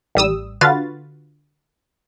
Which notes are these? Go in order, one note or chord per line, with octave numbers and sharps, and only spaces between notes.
A1 G3 D#6 E6
D3 F4 F#4 B4 F5 A6